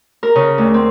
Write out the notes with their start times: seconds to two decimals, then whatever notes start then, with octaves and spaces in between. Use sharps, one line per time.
0.23 A#4
0.35 C#3
0.58 D2
0.74 C4